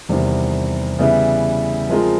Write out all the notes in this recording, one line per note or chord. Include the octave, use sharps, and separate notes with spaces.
E2 C3 D#3 G3
C#3 E3 G3 B3 E4
F3 G#3 C4 F4 A#4